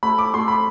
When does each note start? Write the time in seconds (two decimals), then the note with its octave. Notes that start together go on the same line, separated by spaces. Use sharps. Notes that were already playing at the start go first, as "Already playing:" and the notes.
0.03 A3 B5
0.18 D6
0.34 A3 C6
0.48 B5